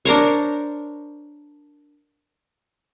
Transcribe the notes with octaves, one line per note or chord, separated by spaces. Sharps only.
D4 A#4 C5 C#5